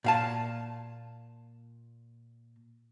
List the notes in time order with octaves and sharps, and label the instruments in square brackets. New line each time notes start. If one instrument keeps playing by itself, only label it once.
[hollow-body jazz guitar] A#2 F5 A5